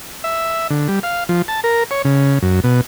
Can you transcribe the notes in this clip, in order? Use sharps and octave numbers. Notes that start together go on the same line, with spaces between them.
E5
D3
G3
F5
F3
A5
A#4
C#5
C#3
F#2
B2